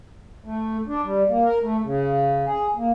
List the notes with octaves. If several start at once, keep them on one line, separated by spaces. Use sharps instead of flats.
A3
D4
G3
A#3
A#4
A3
C#3
G#4
A#3